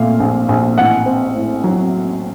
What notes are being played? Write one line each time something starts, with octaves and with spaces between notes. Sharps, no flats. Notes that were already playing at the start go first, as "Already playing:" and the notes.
Already playing: A#2 A3 F5
A#1
A#1
A1 F#5
C4
A2
F#3